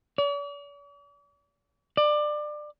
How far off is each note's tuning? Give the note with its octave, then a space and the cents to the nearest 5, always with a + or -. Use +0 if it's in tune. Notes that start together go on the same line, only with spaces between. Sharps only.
D5 -45
D5 +25